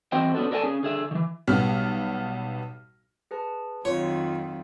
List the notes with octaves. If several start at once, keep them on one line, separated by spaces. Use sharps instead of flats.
E3 C4 F#4 C5 D#5 G5
B3 C#4 D4 F#4 A4
A4 A#4 D5 F5 G#5 A5
C#4 G#4
D3 G#4 E5
D#3 E3
B1 G3 B3 F6
G#4 B4 A5
F2 D#3 F#3 F4 C#5